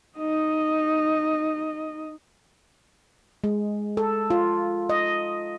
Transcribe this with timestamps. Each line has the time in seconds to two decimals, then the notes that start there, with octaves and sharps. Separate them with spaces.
0.18 D#4 D#5
3.44 G#3
3.97 A4
4.30 F4
4.90 D#5